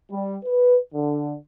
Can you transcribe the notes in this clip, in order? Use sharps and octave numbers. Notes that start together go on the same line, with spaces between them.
G3
B4
D3